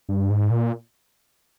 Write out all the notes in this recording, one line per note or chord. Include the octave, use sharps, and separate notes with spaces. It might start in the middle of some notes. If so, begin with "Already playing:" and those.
G2
G#2
A#2